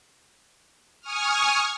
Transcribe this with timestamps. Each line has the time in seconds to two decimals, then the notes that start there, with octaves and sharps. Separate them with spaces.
1.01 G#5 C#6 D#6 F6